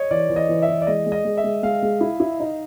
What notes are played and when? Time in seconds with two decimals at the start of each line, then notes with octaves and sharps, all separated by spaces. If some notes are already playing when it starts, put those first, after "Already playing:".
Already playing: C#5 D#5
0.11 E3 D5
0.30 E3
0.36 D#5
0.49 E3
0.62 E5
0.68 E3
0.82 D5
0.87 G#3 D#5
1.06 G#3
1.12 D#5
1.25 G#3
1.37 E5
1.44 G#3
1.63 G#3 F5
1.83 G#3
2.01 E4
2.20 E4
2.40 D#4